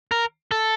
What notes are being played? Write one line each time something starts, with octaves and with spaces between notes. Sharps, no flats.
A#4
A4